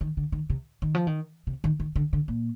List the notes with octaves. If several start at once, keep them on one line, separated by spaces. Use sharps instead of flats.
D#3
D3
D#3
C3
D#3
F3
D#3
C3
D#3
D#3
D3
D3
A#2